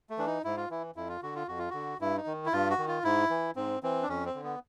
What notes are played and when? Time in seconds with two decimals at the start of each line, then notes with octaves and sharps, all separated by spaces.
0.10 A3
0.18 E3 D4
0.26 D#4
0.44 G#2 E4
0.57 F4
0.70 E3 E4
0.96 F2 E4
1.09 F4
1.23 D3 F#4
1.36 F4
1.48 F2 F#4
1.59 F4
1.70 D3 F#4
2.00 G2 E4
2.17 D#4
2.27 D#3
2.46 E4
2.53 G2 F4
2.70 F#4
2.78 D#3
2.88 F4
3.04 G#2 E4
3.30 E3
3.56 G#2 C4
3.83 E3 C4
4.02 D4
4.08 F2 C#4
4.26 C4
4.35 D3
4.44 B3